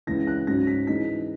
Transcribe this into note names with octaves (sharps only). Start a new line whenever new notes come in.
C#2 C#3 E3 A#6
F#6
G#2 F#3 C#4 A#6
B6
E3 G#3 D#4 B6